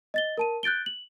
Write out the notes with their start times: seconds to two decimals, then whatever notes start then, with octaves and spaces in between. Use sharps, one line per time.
0.14 D#5 A6 G7
0.38 A#4 A5 D#7
0.63 F#6 G6 A6 D7 G7
0.86 F#7